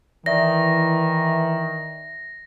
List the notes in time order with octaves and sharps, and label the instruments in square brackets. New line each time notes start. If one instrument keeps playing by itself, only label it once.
[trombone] D#3 [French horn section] E3 [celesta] D5 E5 [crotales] A#6